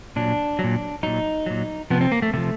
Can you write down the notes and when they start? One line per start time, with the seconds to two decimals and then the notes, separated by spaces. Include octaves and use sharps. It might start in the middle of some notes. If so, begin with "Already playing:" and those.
0.16 A#2 F#3 D4
0.59 F#3
0.64 A#2
1.03 A#2 F#3 D#4
1.46 A#2 F#3
1.90 C3 F3 B3
2.01 C4
2.12 A#3
2.22 A3
2.33 C3 F3 A3